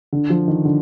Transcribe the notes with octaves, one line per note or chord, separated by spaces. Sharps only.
D3
F3
D#3
D3